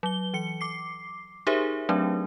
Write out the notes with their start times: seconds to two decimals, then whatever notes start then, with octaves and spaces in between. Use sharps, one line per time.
0.03 F#3 G7
0.34 E3 C#7
0.61 D6 C7
1.47 D#4 G4 G#4 A#4 C5 E5
1.89 F#3 A3 C4 D4